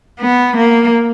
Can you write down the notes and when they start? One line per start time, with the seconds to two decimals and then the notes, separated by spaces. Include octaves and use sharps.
0.20 B3
0.57 A#3